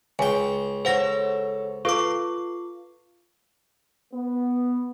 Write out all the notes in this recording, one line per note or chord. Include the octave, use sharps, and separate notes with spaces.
C#2 G5 G#5
A4 C5 C#5 F#5 A#6
F4 A4 B4 F5 C#6 D6
B3